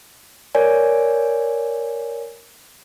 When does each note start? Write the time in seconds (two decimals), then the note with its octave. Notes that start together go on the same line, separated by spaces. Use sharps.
0.55 A#4 C#5 D5 G#5